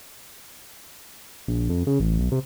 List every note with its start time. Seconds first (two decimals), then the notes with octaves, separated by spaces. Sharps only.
1.48 A#1
1.69 F2
1.87 C#3
2.00 A1
2.19 B1
2.32 C3